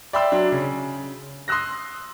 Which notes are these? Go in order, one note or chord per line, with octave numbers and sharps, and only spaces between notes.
D5 E5 G5 B5 C6 E6
F#3 D4
C#3
C6 D#6 E6 F#6 A#6